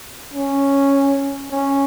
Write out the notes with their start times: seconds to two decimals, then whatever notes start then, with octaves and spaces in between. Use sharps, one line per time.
0.33 C#4
1.51 C#4